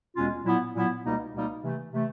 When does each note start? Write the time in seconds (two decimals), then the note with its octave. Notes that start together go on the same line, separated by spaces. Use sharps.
0.16 E2 B2 G#3 C#4 F4
0.45 A#2 F#3 B3 E4
0.74 A#2 F#3 B3 E4
1.04 C#2 B2 G3 A#3 D#4
1.33 C#2 B2 G3 A#3 D#4
1.63 C3 E3 A3
1.92 C3 E3 A3